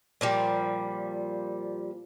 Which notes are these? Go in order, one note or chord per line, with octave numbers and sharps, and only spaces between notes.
A#2 F3 G3